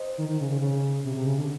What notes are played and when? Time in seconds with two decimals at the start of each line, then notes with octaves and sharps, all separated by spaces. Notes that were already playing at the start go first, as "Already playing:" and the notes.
Already playing: C5 D#5
0.18 D#3
0.29 D#3
0.41 C#3
0.51 C#3
0.61 C#3
1.05 C3
1.16 C3
1.26 C#3
1.38 D3